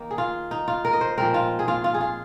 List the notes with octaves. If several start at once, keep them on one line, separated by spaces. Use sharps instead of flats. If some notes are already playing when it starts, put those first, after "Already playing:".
Already playing: D#3 A#3
G#4
F4
D#4
F4
A#4
D#5
C5
A#2 F3 G#3 C4 A#4
F4
G#4
F4
F4
G#4
F4